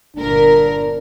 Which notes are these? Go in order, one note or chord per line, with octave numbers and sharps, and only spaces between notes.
G1 A#2 D4 A#4